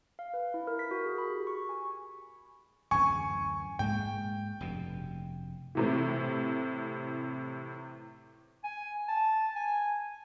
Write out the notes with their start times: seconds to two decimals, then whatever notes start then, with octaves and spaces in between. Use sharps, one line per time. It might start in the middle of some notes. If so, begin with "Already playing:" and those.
0.19 F5
0.34 B4
0.54 E4
0.67 A#4
0.79 B6
0.91 F#4
1.06 G#4
1.18 B5
1.30 G4
1.47 C#6
1.69 G#5
2.91 D1 F#2 E3 G#5 C#6
3.79 G#2 G#3 A#3 G5
4.60 F1 G2 B2
5.75 A2 C3 E3
8.64 G#5
9.08 A5
9.56 G#5